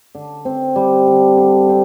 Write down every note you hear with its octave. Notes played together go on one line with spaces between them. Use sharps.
D3
C4
G3
D3
D3
C4